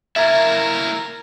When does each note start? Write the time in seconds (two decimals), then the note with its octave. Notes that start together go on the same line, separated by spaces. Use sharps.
0.16 A#3 E4 A#4 E5 A#5 G#6 A6